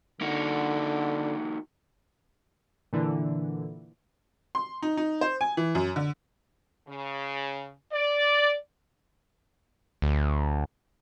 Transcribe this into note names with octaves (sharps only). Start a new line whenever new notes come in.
D3 A#3 D#4 F#4
A#2 D3 E3
C6
D#4
D#4
C5
G#5
E3
F#2
D3
C#3
D5
D2